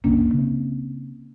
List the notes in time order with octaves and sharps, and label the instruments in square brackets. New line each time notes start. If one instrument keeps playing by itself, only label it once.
[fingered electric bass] F#1 C2 [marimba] A#3 C#4 D4
[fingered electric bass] C#3 C4